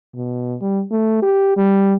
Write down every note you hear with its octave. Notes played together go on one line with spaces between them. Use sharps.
B2
G3
A3
G4
G3